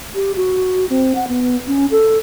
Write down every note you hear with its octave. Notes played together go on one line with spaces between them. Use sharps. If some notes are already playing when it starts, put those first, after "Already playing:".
G4
F#4
C4
F#5
B3
C#4
A4